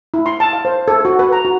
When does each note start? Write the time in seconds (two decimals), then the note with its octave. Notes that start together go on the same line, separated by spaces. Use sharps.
0.14 E4
0.26 C6
0.40 A5
0.53 F5
0.65 C5
0.88 A4
1.05 F#4
1.19 B4
1.32 A#5
1.45 F#4